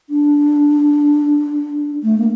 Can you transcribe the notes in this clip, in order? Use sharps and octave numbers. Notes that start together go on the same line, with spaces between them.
D4
A3
A#3